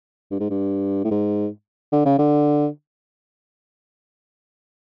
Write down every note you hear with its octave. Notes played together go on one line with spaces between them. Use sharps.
G2
G#2
G2
A2
G#2
D3
C#3
D3